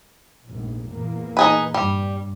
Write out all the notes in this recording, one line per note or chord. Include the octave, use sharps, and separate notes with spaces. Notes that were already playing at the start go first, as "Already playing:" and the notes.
F1 A#1 G#2
E2 A#2 A#3
D#4 G#4 B4
G2 G3